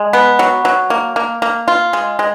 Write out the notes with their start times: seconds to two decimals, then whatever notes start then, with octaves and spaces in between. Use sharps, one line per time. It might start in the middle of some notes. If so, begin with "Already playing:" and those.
Already playing: G#3
0.13 B3
0.39 F#3
0.65 F#3
0.90 A#3
1.16 A#3
1.42 A#3
1.68 F4
1.93 G#3
2.19 G#3